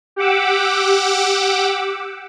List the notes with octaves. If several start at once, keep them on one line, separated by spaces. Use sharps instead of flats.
G4 F#5 D6 E6